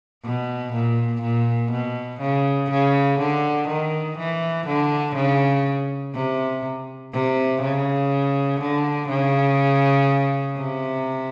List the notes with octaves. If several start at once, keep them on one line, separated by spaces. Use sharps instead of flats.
B2
A#2
A#2
B2
C#3
C#3
D3
D#3
E3
D3
C#3
C3
C3
C#3
D3
C#3
C3